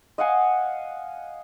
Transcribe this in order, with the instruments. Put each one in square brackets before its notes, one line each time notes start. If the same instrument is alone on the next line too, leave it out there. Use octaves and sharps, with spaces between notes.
[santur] D#5 F5 F#5 G#5